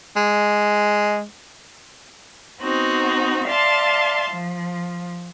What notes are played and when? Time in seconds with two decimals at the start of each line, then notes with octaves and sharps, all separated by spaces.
0.16 G#3
2.60 B3 C4 D#4 F#4
3.47 D5 E5 F5 A5 C6
4.30 F3